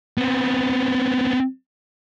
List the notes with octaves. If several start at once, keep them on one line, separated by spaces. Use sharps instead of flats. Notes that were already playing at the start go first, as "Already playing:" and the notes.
B3 C4